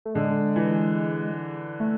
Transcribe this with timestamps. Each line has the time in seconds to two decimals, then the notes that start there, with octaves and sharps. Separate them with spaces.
0.05 A3
0.14 D3 G#3
0.56 E3
1.80 A3